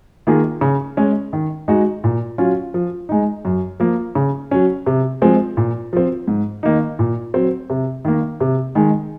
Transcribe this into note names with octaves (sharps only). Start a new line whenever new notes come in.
D#3 A#3 F4 G#4
C#3
G#3 C#4
D#3
G#3 D#4 F#4
A#2
F#3 C#4 F4
F3
G#3 D#4
F#2
F3 A#3
C#3
F#3 C#4
C3
F3 G#3 C4
A#2
F3 C4
G#2
D#3 A#3 D#4
A#2
F#3 C4
C3
D#3 A#3
C3
D#3 G#3